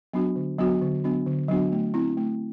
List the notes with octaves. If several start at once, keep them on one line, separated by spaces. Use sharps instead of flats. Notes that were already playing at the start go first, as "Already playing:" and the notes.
F#3 B3 D4 F#4
D3
F#3 B3 D4 F#4
D3
F#3 B3 D4 F#4
D3
F#3 B3 D4 F#4
A3
C4 E4
A3